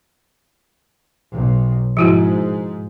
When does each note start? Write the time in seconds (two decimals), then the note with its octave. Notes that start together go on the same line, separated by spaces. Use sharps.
1.32 B1
1.97 G#2 F3 E4 F#4